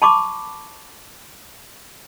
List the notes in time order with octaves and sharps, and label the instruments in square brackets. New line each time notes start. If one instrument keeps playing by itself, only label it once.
[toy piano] A5 B5 C#6 D6